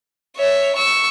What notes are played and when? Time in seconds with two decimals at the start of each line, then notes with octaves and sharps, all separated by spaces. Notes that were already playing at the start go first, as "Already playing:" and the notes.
0.36 C#5 E5
0.75 C#6 E6